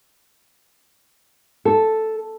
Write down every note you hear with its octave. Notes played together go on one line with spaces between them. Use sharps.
A4